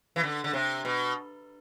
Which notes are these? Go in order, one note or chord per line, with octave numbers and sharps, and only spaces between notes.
E3
D3
D3
C3
B2